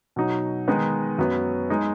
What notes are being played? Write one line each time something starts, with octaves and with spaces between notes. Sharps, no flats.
B2 F#3 D#4
D#3 G#3 B3 D#4
F#2 F#3 B3
G#3 D#4